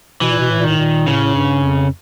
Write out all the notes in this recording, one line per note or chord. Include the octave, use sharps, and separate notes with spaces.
B2 E3
A#2
B2
A2
A#2
A2 D#3
A#2
A2 C#3
G2
F2